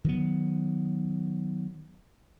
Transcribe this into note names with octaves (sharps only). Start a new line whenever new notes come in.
D#3 F#3 B3